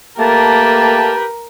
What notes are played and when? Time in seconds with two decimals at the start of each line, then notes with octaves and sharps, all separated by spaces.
0.19 A3 A#3 G4 A#4 B4 G5 A5